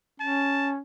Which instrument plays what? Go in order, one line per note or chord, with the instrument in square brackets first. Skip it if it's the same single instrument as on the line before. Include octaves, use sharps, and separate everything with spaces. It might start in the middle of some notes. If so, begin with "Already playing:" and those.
[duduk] C#4 [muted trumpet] A5